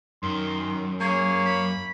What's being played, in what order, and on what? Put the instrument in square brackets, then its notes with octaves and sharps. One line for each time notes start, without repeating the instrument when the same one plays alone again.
[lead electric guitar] F#2 [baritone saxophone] D#3 [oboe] C6
[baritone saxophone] A#3 [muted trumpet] G#4 [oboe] C#5
[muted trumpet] B5